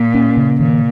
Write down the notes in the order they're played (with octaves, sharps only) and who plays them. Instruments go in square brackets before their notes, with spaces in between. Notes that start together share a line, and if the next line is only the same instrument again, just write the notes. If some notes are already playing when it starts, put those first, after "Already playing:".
Already playing: [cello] A#2
[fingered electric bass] C#4
C#3
[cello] A#2 [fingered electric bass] D#3